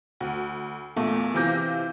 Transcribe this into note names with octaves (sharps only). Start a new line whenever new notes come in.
D2
E2 A#2 A3 A#3
C3 E3 F4 D6 G6 A#6